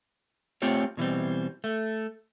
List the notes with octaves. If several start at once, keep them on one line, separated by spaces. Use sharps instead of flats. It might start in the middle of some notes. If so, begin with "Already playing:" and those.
A3 C4 F4 G4 C#5
B2 E3 G3 C4
A3